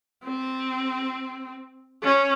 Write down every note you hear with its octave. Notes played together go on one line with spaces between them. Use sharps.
C4
C#4